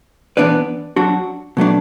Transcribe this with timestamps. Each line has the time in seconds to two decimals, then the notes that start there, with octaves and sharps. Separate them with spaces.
0.37 E3 B3 D4 B4 D5
0.96 F#3 D4 F#4
1.57 B2 F#3 A3 D4